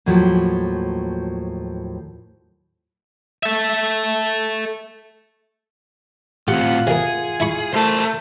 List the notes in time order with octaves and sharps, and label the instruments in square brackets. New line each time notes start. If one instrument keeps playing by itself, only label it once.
[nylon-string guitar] D#2 A2 F3 F#3
[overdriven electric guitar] A4 E5
[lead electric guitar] A2 C4 [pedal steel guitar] F4 F#5 [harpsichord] G4
[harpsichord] C3 A#3 [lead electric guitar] G#4
[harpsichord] E4 B5 C#6
[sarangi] A3 [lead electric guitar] A#4 C5